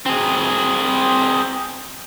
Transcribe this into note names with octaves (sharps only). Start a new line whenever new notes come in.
C4 G#4